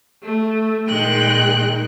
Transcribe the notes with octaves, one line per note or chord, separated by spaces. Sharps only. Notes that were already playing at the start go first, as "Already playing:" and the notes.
A3
A#2 D#3 G#3 G5 F#6